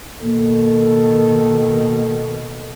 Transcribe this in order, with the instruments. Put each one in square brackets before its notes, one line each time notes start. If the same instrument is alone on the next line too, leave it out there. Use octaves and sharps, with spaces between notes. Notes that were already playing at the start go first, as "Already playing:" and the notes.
[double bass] B2 D#3 [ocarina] A#3 [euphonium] A4